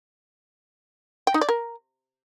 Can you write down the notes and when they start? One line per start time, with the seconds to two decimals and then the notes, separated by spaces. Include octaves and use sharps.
1.27 G5
1.34 D#4
1.41 D5
1.49 A#4